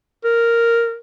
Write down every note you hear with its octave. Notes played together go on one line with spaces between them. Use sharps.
A#4